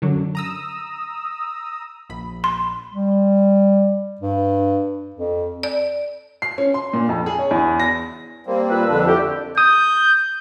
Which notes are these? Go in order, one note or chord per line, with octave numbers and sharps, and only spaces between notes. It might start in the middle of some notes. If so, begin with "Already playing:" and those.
F#2 D3 F#3
A#5 D#6 E6
A#1 B5
C6
G3
G2
F2
D5
C7
C#4
C6
A#2
F2
G#4
C#5
E2
A#6
G3 A#3 C4
A#2 B4 E6
F2 D3 D4
A3 E4 G4
D#6 G6